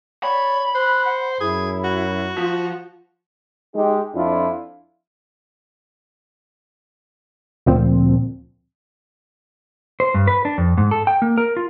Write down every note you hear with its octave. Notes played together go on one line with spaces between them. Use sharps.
C#5 D5 B5
C5 F#6
F#5
F#2 E4 G#4
F#4
F3 F4
G#3 D#4 G4
F2 D4 E4 F4
D2 A#2 F3 C4
C5
G2
B4
D4
F2
G#2
A4
G5
A#3
A#4
F4